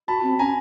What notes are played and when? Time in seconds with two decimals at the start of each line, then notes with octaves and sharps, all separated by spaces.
0.08 F#4 A5 B5
0.23 C4
0.39 C#4 G#5 A#5